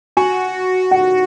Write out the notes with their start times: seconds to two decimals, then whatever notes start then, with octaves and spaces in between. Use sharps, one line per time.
0.17 F#4 G#5
0.91 F#5